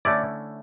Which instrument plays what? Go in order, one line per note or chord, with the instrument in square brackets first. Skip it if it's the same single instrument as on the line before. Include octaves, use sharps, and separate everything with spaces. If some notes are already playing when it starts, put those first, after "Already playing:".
[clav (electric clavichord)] D3 A3 C#4 E4 D5